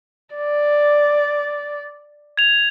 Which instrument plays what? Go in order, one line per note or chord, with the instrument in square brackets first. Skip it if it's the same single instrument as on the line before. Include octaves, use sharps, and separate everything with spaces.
[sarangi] D5
[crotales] G#6 F7